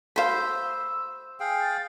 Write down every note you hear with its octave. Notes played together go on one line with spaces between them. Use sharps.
A3 F#4 C5 F5 B5 E6
G#4 F5 G5
A6